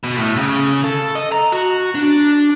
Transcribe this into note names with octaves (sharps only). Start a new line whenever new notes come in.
B2
A2
C#3
A4
D#5
A#5
F#4
D4